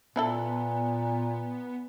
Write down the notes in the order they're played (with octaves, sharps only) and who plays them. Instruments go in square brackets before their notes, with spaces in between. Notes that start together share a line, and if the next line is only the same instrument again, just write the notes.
[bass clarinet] A#2 [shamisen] F3 E4 A4 [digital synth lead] B3